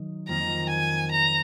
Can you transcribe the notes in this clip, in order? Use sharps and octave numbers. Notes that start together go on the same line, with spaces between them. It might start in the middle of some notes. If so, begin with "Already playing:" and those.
Already playing: D#3 F#3 D#4
F2 D#3 A#3 A#5
G#5
A#5